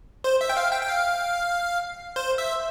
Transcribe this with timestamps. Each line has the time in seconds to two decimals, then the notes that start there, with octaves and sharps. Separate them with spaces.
0.24 C5
0.41 E5
0.49 G5
0.57 F5
0.72 G5
0.82 G5
0.88 F5
2.16 C5
2.38 E5